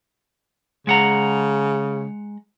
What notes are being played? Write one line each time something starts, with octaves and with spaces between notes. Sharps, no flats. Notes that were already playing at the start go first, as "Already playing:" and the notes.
C#3 G#3 F#5 A#5